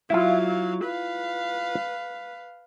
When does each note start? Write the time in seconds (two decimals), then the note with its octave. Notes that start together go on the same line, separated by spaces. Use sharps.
0.10 F#3 E4 F4 F5
0.85 B4 F5